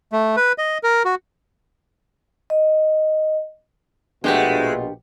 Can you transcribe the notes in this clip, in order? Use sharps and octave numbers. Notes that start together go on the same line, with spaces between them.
A3
B4
D#5
A#4
F#4
D#5
A#1 B2 G#3 A3 D4 F4 G4 F#5